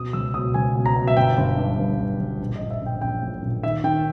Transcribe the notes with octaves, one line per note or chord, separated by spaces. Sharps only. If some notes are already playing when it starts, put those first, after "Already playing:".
Already playing: B2 D#6
C#2 E6
B2 D#6
C#2 G#5
B2
A#5
B2
E5
G1 G5
G1
G2
G1
G1
G1
A#1
A#1 D#5
E5
A#1
G5
A#1 G5
A#2
A#2
D#3 E5
D#3 G5